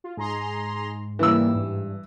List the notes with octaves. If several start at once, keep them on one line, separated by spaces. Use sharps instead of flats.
F4
G#2 G#4 A#5 C6
C#3 E3 G3 A#3 E6
G2